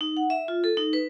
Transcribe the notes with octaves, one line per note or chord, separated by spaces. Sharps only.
D#4
F#5
E5
F4
A4
D#4
B4